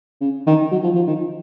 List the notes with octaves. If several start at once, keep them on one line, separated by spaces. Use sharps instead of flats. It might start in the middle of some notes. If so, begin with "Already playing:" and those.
C#3
D#3
F#3
F3
F3
D#3